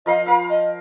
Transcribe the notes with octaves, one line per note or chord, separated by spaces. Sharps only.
F3 A#4 D#5 F5
A#4 F5 B5
D#5